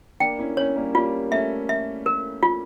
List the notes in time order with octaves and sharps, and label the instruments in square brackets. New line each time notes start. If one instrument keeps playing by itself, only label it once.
[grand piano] A#3 D4 [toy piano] G5
[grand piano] C#4 E4
[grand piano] C#4 E4 [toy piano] C#5
[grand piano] C#4
G3 A#3
[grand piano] G3 A#3 [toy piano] F4
[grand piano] A3 C#4 [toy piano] E5
[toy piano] E5
A#4
F4